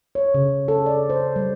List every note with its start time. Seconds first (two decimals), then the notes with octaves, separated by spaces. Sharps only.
0.15 C#5
0.34 C#3
0.68 A4
0.86 D5
1.10 C5
1.36 G3